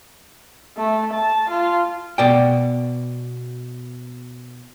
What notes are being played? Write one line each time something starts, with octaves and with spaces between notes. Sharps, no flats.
A3
A5
F4
B2 D5 G5